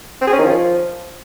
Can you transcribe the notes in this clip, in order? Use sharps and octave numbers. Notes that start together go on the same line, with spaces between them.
C4
G#4
C#4
D#3
F3